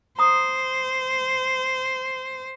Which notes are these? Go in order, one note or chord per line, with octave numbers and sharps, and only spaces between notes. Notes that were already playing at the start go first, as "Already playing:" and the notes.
C5 A#5 D#6